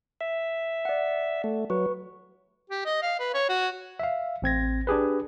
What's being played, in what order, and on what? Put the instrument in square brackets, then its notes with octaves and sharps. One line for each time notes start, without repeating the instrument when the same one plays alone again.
[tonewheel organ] E5
[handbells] D5 F#5
[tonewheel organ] A3
[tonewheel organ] F#3 [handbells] B4 C#6
[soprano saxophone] G4
D#5
F5
B4
C#5
F#4
[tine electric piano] E5 F5
A1 C4 G#6 A#6
D4 G4 G#4 B4